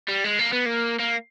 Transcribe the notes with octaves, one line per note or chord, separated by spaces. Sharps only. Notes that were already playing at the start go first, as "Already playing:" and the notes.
G3
G#3
A#3
B3
A#3
A#3